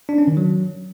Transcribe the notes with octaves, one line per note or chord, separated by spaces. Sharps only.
D4
C#4
D#3
F#3